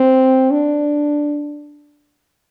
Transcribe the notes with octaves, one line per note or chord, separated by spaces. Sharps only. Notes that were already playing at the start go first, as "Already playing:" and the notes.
Already playing: C4
D4